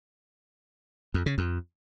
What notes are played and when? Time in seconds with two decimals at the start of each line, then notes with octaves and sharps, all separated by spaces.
1.14 F2
1.26 C#3
1.38 F2